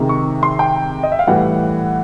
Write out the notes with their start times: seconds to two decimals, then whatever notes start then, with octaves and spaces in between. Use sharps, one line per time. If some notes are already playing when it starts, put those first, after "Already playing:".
Already playing: C3 D#3 G#3
0.09 C#6
0.43 C6
0.59 G5
1.03 D#5
1.12 E5
1.19 F5
1.27 A2 E3 G3 F#5